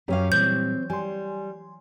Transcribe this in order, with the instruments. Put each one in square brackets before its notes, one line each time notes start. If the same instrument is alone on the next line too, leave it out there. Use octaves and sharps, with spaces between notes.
[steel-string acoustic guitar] F#2 C#4 F5 [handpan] F#3 G4 C#5
[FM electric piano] A#2 G3 [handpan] E3 [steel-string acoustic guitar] C4 [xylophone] G6
[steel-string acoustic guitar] G3 [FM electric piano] G#5 C6